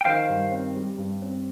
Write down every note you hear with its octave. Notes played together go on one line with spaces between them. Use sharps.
G5
D#3 C5 F5
G2
C4
G3
G2
C4